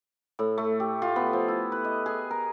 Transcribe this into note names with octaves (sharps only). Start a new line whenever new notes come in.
A2
A3
G4
F4
B3
F3
E4
B4
D#5
G#4
A#4